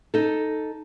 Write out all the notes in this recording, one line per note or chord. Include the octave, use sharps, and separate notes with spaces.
D#4 A4